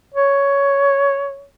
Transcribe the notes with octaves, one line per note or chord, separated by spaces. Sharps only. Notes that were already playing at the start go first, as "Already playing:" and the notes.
C#5